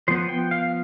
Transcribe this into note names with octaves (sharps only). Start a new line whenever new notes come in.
F3 B3 C5
G5
F5